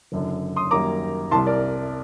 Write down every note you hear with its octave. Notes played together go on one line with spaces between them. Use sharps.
F#1 F#2 D3
C6 D#6
F#2 D#3 G3 A#3 A#5 D6
C2 C3 G3 A5 C6
A#4 D5